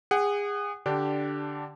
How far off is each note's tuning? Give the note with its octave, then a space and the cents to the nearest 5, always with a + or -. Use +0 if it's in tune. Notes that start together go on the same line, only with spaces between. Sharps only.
G#4 -25 F#5 +15
D3 +0 D4 -5 G4 -10